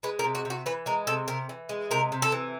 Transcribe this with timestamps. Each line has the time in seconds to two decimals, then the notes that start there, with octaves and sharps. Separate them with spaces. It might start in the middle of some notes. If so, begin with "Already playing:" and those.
0.03 G#3 B4
0.19 A#4
0.24 C3
0.35 F#4
0.45 C3
0.50 F#4
0.66 E3 B4
0.86 G#3 A#4
1.07 C3 A4
1.28 C3 A#4
1.49 E3
1.69 G#3
1.91 C3 A#4
2.12 C3
2.22 A4
2.32 E3